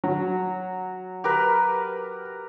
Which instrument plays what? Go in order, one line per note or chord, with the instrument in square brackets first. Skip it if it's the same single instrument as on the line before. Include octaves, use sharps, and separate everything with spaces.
[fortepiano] F#3
[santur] G4 A#4 B4